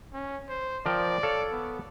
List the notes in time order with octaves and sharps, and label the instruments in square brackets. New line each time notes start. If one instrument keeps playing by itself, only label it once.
[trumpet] C#4
C5
[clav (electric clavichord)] F3 A#4 G5 [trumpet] D5
[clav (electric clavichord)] A4 C#5 F5
[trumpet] B3